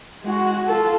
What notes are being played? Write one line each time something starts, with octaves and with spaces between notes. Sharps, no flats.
G#3 F#4
F4 A4